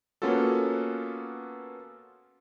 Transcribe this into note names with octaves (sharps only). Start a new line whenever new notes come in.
A#3 B3 C#4 F4 F#4 A4